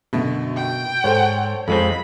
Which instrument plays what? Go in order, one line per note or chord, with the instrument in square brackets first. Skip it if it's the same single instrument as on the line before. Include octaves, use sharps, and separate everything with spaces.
[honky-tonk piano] F#2 D3 A3 [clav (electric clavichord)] B2
[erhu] G5
[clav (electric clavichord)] G#2 [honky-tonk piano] A4 C5 C#5
[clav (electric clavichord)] F2 G#3 C4 [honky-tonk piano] A4 [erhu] B5